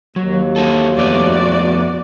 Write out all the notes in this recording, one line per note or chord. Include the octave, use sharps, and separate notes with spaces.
D#2 F#3
A#3 F#4 A4
F2 A3 B3 F#4 D5